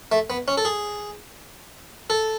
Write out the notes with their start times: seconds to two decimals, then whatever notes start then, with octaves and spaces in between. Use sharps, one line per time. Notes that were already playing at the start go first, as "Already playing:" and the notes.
0.12 A3
0.30 B3
0.48 C#4
0.57 A4
0.65 G#4
2.10 A4